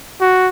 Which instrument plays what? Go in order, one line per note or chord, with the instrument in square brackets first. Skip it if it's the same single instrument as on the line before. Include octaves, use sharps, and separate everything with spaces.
[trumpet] F#4